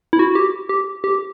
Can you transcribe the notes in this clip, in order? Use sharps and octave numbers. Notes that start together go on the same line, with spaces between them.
E4
F#4
G4
G4
G4